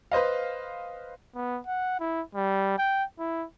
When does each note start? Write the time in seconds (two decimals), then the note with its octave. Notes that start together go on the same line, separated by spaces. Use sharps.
0.11 B4 C5 D#5 F5
1.35 B3
1.67 F#5
2.00 E4
2.35 G3
2.78 G5
3.19 E4